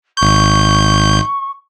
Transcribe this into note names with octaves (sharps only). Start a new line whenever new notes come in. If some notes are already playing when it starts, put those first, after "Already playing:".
G#1 C#6 G6